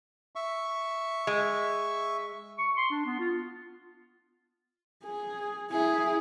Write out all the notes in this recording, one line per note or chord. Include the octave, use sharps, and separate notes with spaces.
E5 C#6
G#3
C#6
C6
D4
B3
F4
G#4
E4 G#4